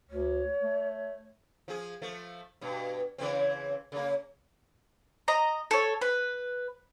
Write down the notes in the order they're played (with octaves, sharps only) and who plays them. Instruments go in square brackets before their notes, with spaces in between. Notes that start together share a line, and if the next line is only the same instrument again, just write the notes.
[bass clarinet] D2 [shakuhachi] C#5
[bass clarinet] A3
[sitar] F3 G#4
F3 A3
G2 B2
C#3 E3 C4
C#3 A#3
[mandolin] D#5 A#5
A4 C#5
B4